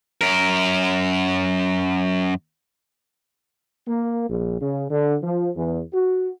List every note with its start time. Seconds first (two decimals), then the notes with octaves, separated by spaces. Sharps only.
0.21 F#2 A#4
3.88 A#3
4.30 A#1
4.61 C#3
4.90 D3
5.22 F3
5.56 E2
5.94 F#4